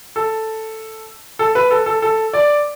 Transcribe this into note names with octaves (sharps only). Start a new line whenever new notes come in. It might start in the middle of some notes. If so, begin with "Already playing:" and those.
A4
A4
B4
A4
A4
A4
D5